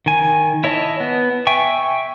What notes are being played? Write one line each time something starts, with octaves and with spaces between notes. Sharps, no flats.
D#3 G#5
E4 C#5 D#5 A5
B3
E5 G5 G#5 C#6